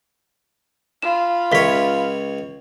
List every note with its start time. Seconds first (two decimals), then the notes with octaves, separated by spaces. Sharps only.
1.02 F4 B5 E7
1.52 C#2 A#4 C#5 E5 B6